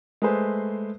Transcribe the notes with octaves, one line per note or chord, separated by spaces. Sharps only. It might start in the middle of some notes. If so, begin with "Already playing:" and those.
G#3 A3 G#4 B4 C5